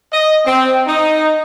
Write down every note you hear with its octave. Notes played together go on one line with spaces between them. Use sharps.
D#5
C4
D#4